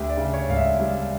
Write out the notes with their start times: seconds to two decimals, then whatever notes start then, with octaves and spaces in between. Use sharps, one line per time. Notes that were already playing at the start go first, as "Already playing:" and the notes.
Already playing: D2 G4
0.10 D5
0.17 C#3
0.34 C#5
0.49 E1 F5
0.56 E5
0.80 G3 F5